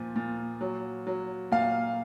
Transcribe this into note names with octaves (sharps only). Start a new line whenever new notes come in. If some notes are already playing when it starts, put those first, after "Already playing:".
Already playing: A#2 F3
A#2
F#3
F#3
A#2 F5